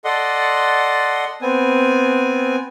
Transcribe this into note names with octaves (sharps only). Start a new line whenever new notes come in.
A4 D5 D#5 F#5 C6
B3 C4 G#5